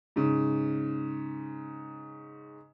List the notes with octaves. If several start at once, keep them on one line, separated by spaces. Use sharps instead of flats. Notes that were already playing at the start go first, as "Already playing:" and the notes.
G#2 C#3